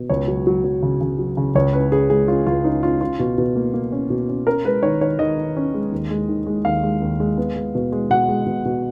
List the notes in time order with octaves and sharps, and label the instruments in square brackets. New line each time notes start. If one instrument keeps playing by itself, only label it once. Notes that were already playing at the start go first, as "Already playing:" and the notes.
Already playing: [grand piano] B2
C#2 C#5
F#3
F#3
F#3
C#3
C#3
F#3
C#3
C#2 C#5
C#4 B4
C#4 G#4
G#3 G#4
C#4 F4
C#2 F4
C#4 D#4
C#4 F4
C#4 F4
B2
B2
A#3
A#3
C#4
B2
C#4
C#4 A#4
G#3 B4
D#3 C#5
D#3 C#5
D#3 D#5
D#3
C#4
G#3
D#2
G#3
D#3
G#3
D#2 F5
G#3
D#2
G#3
B3
G#3
B2
G#3
B2 F#5
G#3
B2
B2